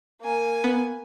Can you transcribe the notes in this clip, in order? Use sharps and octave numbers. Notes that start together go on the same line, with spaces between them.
A#3 G#5
B3